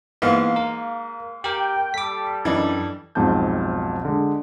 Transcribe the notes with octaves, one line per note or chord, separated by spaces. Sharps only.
G#2 E3 A#3 B3 F5
A#4
G4 A#4 G5
G3 A4 D6 B6
F#2 E3 D4 D#4
B1 F2 G#2 C4 A5 G6
D3 G#3